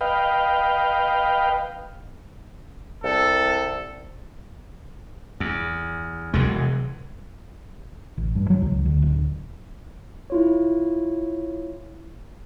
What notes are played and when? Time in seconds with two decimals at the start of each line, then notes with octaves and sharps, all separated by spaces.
0.01 B4 D#5 F5 G5
3.04 C2 A4
5.40 E2
6.34 E1 E2 C3 F#3 G#3
8.17 A1
8.35 G2
8.50 F#3
8.62 C#2
8.85 D2
9.02 D1
10.30 E4 F4 C#5